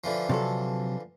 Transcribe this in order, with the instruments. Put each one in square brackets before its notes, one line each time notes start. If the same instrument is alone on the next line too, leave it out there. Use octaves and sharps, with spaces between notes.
[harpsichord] D3 E3 F3
[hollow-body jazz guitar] C3 F#3 A4